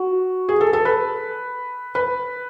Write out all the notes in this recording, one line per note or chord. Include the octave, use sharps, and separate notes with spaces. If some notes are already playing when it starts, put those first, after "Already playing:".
Already playing: F#4
G#4
A4
A4
B4
B4